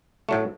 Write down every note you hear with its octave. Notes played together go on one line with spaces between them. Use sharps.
A2 F#3 A3